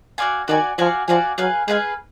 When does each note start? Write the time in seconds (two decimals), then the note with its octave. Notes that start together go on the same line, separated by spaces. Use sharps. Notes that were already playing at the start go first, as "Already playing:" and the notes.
0.18 F#4 D5 F5 G#5
0.48 D#3 F#4 D5 F5 G#5
0.78 F3 F#4 D5 F5 G#5
1.08 F3 F#4 D5 F5 G#5
1.38 F#3 G#4 B4 F5 G#5
1.68 G#3 G#4 B4 F5 G#5